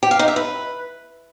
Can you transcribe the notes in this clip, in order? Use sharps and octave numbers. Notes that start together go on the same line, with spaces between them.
G4
F5
D#4
E5
B4